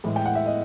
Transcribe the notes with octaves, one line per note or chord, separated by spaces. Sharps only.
A2 E3 G#3
G5
F#5
E5
D#5